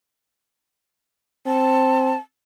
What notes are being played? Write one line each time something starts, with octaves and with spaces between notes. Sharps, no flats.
C4 A5